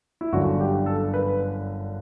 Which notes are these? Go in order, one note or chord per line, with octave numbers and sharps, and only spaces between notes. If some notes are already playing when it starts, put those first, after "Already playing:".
E4
G1 F#2 D3 F#4
G4
A4
B4